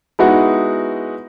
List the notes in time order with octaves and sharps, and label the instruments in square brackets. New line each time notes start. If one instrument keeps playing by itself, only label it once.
[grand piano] G#3 B3 D#4 E4 F#4 F#5